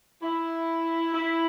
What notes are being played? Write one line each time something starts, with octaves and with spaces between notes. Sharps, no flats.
E4
E4